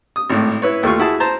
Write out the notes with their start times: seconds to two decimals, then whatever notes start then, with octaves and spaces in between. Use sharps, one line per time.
0.16 D#6
0.30 G#1 A2
0.62 E4 B4 C#5
0.83 D#2 A3 F4 C#6
1.00 E4 F#4 G#4 A5
1.20 C5 A5 A#5